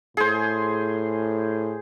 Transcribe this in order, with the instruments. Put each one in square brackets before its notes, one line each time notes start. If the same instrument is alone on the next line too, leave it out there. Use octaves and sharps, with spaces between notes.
[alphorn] A2 [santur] G#4 C5